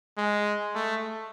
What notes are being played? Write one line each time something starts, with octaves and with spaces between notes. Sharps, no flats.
G#3
A3